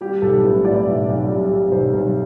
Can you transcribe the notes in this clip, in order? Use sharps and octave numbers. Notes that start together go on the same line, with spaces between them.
G3 G4
B1 A4
A2 B4
A2 D5
B1 E5
B1
G3
G3
B1 C5
B1